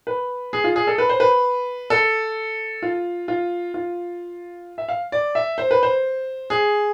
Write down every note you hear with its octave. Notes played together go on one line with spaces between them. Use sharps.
B4
G#4
F4
G#4
A4
B4
C5
B4
A4
F4
F4
F4
E5
F5
D5
E5
C5
B4
C5
G#4